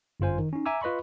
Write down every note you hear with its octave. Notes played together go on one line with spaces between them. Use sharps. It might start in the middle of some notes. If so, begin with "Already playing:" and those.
G1 F#2 F4 C5 G#5
D#3
C#4 D#4
E5 G#5 A#5 D6 E6
F4 B4 D#5 B5 C#6